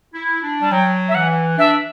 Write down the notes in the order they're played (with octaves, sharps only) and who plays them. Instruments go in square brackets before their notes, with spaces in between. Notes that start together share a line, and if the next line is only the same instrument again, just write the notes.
[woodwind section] E4
D4
[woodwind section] G3 [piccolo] A5
[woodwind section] F#3 [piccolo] G5
[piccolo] E5
[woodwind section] E3 [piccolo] F#5
[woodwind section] D4 [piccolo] E5